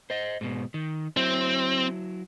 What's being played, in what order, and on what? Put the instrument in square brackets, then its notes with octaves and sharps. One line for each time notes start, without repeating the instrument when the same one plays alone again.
[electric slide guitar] C5 D#5
G#2 B2
D#3
[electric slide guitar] F#3 E4 [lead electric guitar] C4